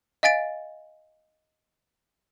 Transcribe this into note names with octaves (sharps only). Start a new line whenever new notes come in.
D#5 F5 G#5 A6 D7